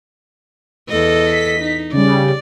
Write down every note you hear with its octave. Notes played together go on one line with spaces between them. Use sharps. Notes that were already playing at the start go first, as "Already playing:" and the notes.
E2 A4 D#5
B6
D#4
C#3 G3 D5